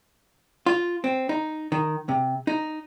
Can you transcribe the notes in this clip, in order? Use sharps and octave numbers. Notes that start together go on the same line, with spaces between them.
F4
C4
D#4
D#3
C3
D#4